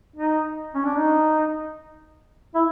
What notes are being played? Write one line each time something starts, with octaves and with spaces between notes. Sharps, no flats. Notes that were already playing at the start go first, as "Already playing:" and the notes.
D#4
C#4
D4
D#4
E4